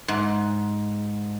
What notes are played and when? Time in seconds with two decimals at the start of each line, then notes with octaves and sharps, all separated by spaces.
0.08 G#2